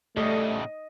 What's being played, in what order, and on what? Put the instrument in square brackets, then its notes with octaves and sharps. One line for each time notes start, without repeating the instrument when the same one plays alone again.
[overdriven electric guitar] A2 C#3 [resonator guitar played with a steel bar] G3 A4 [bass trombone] A3 [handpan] D#5